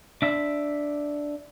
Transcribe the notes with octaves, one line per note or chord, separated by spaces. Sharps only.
D4 E5